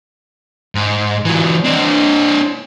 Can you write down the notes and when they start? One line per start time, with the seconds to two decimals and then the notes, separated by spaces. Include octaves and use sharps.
0.75 G#2
1.25 E3 F#3
1.64 C4 D4